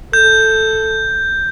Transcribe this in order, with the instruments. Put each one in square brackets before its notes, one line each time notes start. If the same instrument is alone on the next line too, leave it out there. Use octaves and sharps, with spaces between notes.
[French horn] A4 [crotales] G6